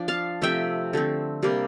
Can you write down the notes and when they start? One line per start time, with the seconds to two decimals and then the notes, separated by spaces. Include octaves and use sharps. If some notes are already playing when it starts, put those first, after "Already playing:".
Already playing: F3 D4
0.08 F5 A5
0.42 C3 F3 A3 C4 E5 G5
0.93 D3 A3 C4
1.43 C3 G3 A#3 D4